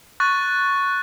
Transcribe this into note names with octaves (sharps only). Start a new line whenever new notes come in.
C#6 F#6 A6